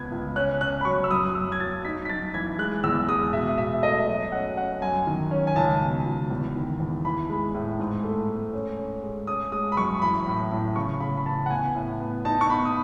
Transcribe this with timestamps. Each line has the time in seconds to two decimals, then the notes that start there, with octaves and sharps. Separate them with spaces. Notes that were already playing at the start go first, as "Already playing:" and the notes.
Already playing: C#2 B3 G#6
0.11 C#2
0.36 C#4 F#6
0.61 C#4 F#6
0.81 B5
0.85 F#3 C#6
1.04 E6
1.11 F#2 D#6
1.26 D#6
1.35 F#2 E6
1.52 G#6
1.60 F#3 A6
1.85 D#4 B6
2.05 B6
2.09 F#2 A6
2.34 E3 G#6
2.59 G#3 F#6
2.84 E2 E6
3.08 G#3 D#6
3.33 B2 E5
3.58 B2 E5
3.83 A3 D#5
3.97 E5
4.08 F#3 D#5
4.32 C#4 F#5
4.57 C#4 F#5
4.82 F#2 G#5
5.07 D#3
5.31 C#4
5.47 G#5
5.56 C#2 A5
5.81 B2
6.06 C#2
6.30 E2
6.56 D#3
6.80 E2
7.05 E3 B5
7.30 G#3
7.55 A2
7.79 G#2
8.04 A3
8.29 G#2
8.53 C#4
8.78 C#4
9.03 G#3
9.27 C#4 D#6
9.52 G#3 D#6
9.72 B5
9.77 F#2 C#6
10.02 E3 B5
10.27 A2
10.52 A2
10.76 C#3 C#6
11.00 C#3 B5
11.17 B5
11.26 E3 A5
11.46 F#5
11.50 B3 G#5
11.75 A2
12.00 B3
12.25 D#4 A5
12.41 C#6
12.49 B3 B5
12.65 D#6